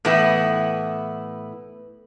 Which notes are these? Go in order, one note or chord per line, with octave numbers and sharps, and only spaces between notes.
A2 E3 B3 E4